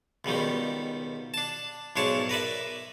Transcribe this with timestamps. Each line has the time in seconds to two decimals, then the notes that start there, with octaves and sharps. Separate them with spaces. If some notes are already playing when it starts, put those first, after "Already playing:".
0.25 C#2 B2 D#3 G3
1.34 D4 A5
1.96 B1 G#2 D4 C#5 A5
2.29 A#4 B4 D5 E5